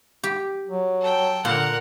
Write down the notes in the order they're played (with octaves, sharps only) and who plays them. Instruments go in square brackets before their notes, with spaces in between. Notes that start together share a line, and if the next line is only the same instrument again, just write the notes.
[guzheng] G4
[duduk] F#3
[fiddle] A4 G5
[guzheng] A#2 [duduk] D3 [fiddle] A#4 F#5